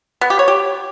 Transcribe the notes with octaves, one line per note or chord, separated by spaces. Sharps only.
B3
G4
C#5
G4